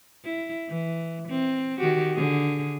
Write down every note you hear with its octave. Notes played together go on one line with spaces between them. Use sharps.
E4
E3
C4
D#3 F#4 G4
D3 G#4